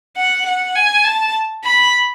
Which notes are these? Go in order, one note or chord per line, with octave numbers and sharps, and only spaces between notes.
F#5
F#5
G#5
A5
B5